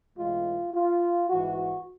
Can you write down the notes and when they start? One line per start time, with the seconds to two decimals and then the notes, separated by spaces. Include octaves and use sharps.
0.18 B1 A2 E3 G#3 F4
0.73 F4
1.30 A1 G#2 E3 F#4